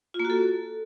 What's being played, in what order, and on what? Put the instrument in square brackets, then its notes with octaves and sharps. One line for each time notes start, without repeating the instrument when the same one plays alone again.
[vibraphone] F4
A#3
F#4
A4